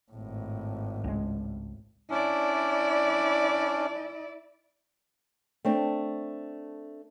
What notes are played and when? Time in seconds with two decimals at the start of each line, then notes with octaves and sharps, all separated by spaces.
0.12 G#1 A2
1.04 C#2 G#3
2.10 C#4 D4 E4 D5
5.65 A3 C4 D4